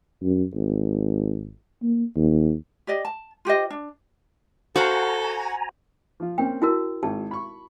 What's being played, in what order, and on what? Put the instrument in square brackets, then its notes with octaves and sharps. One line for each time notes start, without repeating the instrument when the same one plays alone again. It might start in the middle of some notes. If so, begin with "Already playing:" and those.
[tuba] F#2
G#1
A#3
D#2
[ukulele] G4 D5 D#5
A5
F4 G4 C5 D#5
D4
[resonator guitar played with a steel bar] F#4 [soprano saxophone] A4 [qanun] C5 F5 F#5 [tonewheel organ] G#5 A#5
[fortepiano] F3 F4
[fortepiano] A#3 C4 C#4 [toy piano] G5
[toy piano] E4 F#4 A#4 [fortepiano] A5
[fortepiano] G#1 [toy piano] A5
[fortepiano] B5 C#6